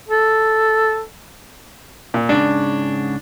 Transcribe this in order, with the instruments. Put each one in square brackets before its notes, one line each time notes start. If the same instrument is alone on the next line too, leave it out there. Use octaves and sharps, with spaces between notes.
[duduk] A4
[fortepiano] A#2
[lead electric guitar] G#2 C#3 [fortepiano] D4